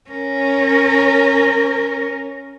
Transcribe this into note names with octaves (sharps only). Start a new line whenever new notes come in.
C#4 A#4